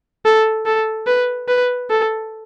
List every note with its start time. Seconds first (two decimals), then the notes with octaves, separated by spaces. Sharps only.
0.25 A4
0.66 A4
1.07 B4
1.48 B4
1.91 A4